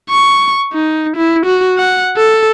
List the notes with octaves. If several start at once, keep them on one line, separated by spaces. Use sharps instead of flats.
C#6
D#4
E4
F#4
F#5
A4